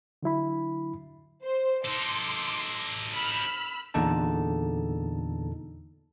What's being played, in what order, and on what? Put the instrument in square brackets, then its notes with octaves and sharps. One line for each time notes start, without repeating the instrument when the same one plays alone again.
[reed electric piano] D3 F#3 E4 B5
[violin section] C5
[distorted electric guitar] D#4 A4 [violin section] C6 D6
[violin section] B5 E6 F6
[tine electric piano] E2 A#2 D3 D#4 A4 A5